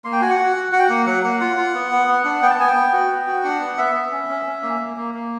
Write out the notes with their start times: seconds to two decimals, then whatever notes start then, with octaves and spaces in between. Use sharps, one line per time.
0.05 A#3 C6
0.13 G5
0.21 F#4 G#5
0.30 F#5
0.39 F#4
0.56 F#4
0.72 F#4 F#5
0.79 G5
0.87 A#3 F#5
1.06 F#3 F#5
1.24 A#3 F#5
1.40 F4 F#5
1.57 F4
1.74 B3
1.92 B3
2.08 B3
2.25 D4
2.42 B3 G5
2.50 A5
2.59 B3 G#5
2.68 G5
2.76 B3
2.93 F#4
3.10 B3
3.27 F#4
3.44 D4 F#5
3.60 B3
3.78 B3 E5
3.95 B3
4.12 C#4
4.29 C#4
4.46 C#4
4.62 A#3
4.80 A#3
4.97 A#3
5.14 A#3